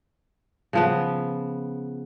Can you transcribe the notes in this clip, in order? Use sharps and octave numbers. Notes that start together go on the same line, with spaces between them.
C#3 F3 B3